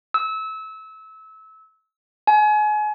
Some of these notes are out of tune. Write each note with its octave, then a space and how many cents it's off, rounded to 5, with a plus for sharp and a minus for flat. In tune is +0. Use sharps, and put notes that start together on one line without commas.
E6 -25
G#5 +30